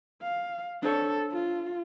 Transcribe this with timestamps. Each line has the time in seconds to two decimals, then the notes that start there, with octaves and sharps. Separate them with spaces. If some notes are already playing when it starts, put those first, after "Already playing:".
0.22 F5
0.83 D4 A4 C5 C#5
1.31 F4